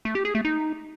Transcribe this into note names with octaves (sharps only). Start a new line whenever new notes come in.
A3
G4
G#4
A3
D#4